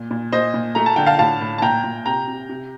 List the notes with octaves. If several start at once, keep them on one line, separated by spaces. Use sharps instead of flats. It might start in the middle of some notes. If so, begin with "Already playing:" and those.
Already playing: A#2
A#2
A#2 C5 D#5
A#2
A3 A#5
A5
D3 G5
F5 A5
A2 F5 A5
A2
A5
A#2 G5 A#5
A#2
C3 G5 A#5
C3
C3